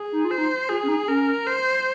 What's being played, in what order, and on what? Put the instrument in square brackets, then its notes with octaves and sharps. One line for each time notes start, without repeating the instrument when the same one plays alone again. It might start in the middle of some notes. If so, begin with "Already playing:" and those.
Already playing: [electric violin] G#4
[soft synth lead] D#4
F4
[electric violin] C5
[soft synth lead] D#4
[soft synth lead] F4 [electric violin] G#4
[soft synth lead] C#4
D#4
[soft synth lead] C#4 [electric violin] A#4
[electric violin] C5